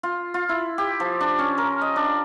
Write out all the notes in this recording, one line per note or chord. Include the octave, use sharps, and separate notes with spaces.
F4
F4
E4
G4
F3
D4
C#4
A#4
D#5
D4